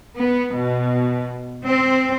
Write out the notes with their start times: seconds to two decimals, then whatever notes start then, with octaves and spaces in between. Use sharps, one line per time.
0.16 B3
0.52 B2
1.63 C4